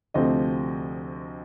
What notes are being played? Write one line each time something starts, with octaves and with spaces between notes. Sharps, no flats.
D2 C3 F3 A3 C4 D#5